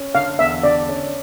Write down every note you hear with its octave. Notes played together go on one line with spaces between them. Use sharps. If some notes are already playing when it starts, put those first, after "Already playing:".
Already playing: C#4
D3 F5
E2 E5
D3 D5
C#4